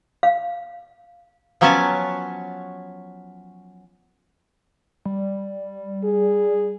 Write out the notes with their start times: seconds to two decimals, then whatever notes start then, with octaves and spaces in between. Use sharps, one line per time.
0.23 F5
1.61 F3 F#3 B3 C#4 G#5 A5
5.05 G3
6.04 G#4